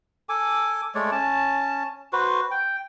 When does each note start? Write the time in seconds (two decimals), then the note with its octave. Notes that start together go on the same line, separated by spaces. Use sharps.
0.29 A4 G#5 D6
0.95 G#3 A3 C#5 D5
1.12 C#4 A5
2.13 F#4 B4 C5
2.51 G5